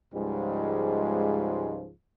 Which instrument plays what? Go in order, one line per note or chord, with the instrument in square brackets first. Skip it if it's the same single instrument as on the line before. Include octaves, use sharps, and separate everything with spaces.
[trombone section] C#2 G#2 F3 G3 G#3